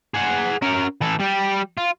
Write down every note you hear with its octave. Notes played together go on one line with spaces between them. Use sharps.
G#4 F#5
C#4 A#4
E3 A4
G3 G4
F4